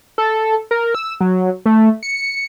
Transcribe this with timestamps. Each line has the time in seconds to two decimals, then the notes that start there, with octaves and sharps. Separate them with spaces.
0.18 A4
0.71 A#4
0.95 E6
1.21 F#3
1.66 A3
2.03 C#7